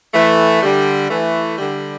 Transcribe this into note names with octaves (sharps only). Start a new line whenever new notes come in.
E3 A3
D3 G3
E3 A3
D3 G3